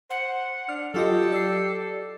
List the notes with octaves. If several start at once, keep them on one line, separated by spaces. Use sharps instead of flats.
C5 F#5
D4 F6
F#3 F4 G4 A4 D#5
D5 E6 C7